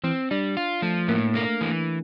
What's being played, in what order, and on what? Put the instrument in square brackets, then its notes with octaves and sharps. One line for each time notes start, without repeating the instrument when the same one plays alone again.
[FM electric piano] E3 [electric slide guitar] C4
[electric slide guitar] G3 [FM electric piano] D4
[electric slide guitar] F4
[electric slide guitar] F3 [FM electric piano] A3
[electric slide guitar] A2 [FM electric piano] A#3
[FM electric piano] A3 [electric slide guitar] A#3
[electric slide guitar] E3